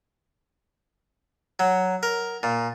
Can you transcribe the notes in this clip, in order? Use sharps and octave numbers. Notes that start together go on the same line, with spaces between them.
F#3
A#4
A#2